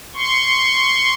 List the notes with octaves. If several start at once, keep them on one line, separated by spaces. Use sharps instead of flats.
C6 C#6